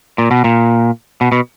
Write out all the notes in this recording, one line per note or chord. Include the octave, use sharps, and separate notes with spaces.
A#2
B2
A#2
B2
B2